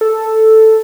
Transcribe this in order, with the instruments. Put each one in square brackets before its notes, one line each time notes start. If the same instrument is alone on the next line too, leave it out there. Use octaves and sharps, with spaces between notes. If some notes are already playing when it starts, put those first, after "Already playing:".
[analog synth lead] A4